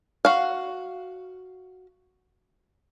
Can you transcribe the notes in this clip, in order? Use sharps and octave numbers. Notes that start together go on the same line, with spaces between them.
F#4 F5